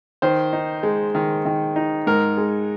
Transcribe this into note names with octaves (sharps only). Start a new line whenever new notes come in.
D#3 C5
D#4
G#3
D#3
D#3
D#4
G#2 A#4
G#3